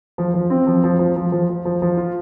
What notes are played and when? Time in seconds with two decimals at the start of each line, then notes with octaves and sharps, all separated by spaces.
0.18 F3
0.34 F3
0.50 C4
0.67 F3
0.84 F3
0.99 F3
1.16 F3
1.32 F3
1.49 F3
1.65 F3
1.82 F3
1.97 F4